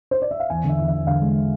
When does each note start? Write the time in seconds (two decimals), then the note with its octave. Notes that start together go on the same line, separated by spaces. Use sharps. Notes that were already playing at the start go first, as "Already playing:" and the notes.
0.11 C5
0.22 D5
0.31 E5
0.40 F5
0.50 E2 G#5
0.64 D3 E5
0.79 E2
0.88 E5
0.93 E2
1.07 D3 F5
1.21 G#3